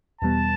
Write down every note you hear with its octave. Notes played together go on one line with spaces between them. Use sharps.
E2 B2 G3 B3 A5